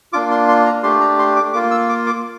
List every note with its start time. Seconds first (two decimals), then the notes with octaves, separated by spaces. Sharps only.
0.13 A#3 D4 F4 D6
0.31 C6
0.48 C6
0.66 A#5
0.83 A3 D4 G4 C6
1.01 A#5
1.19 C6
1.36 D6
1.53 A#3 F4 D6
1.71 E6
1.89 D6
2.07 D6